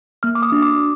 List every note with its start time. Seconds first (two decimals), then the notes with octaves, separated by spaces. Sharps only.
0.23 A#3 F6
0.35 D6
0.42 D#6
0.52 D4 F#4
0.62 D6